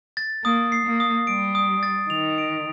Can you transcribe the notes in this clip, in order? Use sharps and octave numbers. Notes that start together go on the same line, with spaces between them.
A6
A#3 D#6
C7
A#3
D#6
G3 D7
D#6
A6
D#3 F7
D7